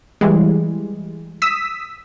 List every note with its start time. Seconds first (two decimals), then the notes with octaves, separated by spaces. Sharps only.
0.21 E3 G3 G#3
1.42 D#6 E6 B6